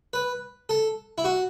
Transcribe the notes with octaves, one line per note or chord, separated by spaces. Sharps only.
B4
A4
E4
F#4